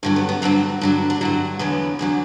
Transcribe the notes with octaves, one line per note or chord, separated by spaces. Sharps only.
G2 D3 F#3 E4
B3
B3
G2 D3 F#3 C4
G2 D3 F#3 D4
D4
G2 D3 F#3 E4
E2 D3 F#3 B3
E2 D3 F#3